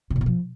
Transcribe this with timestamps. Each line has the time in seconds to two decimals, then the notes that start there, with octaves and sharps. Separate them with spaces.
0.10 C3
0.16 A2
0.21 B2
0.26 F3